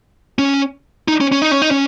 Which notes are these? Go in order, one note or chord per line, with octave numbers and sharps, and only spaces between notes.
C#4
D#4
C#4
C#4
D#4
C#4
D#4
C#4